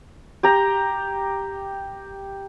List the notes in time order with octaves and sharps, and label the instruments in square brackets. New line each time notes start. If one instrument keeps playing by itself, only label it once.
[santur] G4 A#5